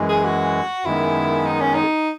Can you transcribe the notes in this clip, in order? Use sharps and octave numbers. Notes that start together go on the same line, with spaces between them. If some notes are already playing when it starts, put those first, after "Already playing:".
Already playing: F#2 E3 G#3
G#4
F#4
F#2 D#3 G#3 B3 E4
D#4
C#4
D#4